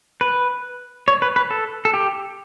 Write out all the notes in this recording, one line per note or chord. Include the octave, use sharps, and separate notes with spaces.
B4
C#5
B4
B4
A4
A4
G4